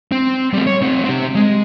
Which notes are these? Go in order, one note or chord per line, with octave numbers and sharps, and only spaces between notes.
C4
G3 A3
C#5
A3 C4
C4 G4
G#3